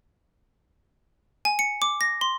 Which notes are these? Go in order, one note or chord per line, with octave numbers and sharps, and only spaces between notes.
G#5
C#7
D6
A#6
C6